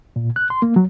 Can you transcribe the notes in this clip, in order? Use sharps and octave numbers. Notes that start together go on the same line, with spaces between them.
A#2
F#6
C6
A#3
F#3